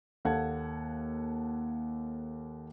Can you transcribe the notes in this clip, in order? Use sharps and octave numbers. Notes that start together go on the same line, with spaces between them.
D#2 A4 F5 F#5 G#6